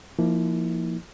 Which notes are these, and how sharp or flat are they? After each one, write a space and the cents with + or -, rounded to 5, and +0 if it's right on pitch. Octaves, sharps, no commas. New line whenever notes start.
F3 -20 A#3 +0 E4 -40